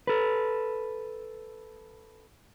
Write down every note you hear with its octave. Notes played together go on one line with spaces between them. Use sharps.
A4 B4